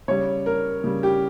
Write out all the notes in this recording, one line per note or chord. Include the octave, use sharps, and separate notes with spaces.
C#3 G3 C#5
A#4
C#3 G3
G4